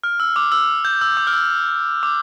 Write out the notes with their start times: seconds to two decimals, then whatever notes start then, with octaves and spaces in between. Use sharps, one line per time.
0.04 F6
0.20 E6
0.36 D6
0.52 E6
0.85 G6
1.01 E6
1.17 D6
1.27 F6
1.33 E6
2.03 D6